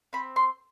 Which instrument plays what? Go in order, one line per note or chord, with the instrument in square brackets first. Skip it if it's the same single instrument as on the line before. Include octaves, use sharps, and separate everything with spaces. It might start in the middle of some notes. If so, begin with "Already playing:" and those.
[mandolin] C4 B5
C6